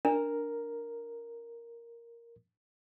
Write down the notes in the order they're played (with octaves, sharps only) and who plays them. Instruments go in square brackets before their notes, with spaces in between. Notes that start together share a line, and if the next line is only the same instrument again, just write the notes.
[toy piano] D4 [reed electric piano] A#4